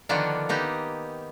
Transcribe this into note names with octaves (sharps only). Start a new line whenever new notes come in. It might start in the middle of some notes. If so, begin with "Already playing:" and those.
D3 D#3 F3 A#3 B3 D4
A#3 B3 D#4 G4